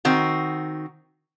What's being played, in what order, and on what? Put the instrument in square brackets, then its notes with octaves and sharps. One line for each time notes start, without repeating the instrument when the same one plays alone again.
[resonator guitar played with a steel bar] D#3 C4 F#4